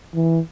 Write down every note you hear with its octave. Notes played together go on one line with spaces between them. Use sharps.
E3